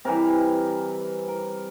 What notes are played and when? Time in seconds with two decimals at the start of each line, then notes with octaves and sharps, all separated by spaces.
0.05 C3 E3 G3 A#4
1.28 A#4